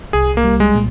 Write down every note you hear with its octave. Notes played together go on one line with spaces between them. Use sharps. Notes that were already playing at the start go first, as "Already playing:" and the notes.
C2 G#4
A#3
G3
G#3
A#2